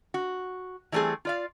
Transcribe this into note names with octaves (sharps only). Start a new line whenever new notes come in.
F#4
E3 G3 A3 C4 G#4
F4 D5 F5